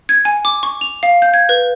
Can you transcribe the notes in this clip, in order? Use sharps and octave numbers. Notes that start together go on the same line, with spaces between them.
G#6
G#5
D6
C#6
F7
F5
G6
G#6
B4